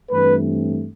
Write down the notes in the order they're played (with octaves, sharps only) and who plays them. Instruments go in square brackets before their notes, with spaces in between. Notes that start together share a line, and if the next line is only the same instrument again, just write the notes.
[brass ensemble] G2 E3 A3 C4 B4